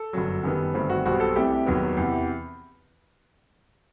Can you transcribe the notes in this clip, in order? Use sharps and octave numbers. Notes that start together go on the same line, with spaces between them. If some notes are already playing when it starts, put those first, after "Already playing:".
Already playing: A4
G1 F#2 F#3
F#2 D#3 G3 B3
G1 G2 D#3 A3 C4
F#4
B1 B2 G3 C4 F#4
A4
C2 C3 E3 A3 G4
E1 D#2 D#3 F#3 B3
E2 C3 E3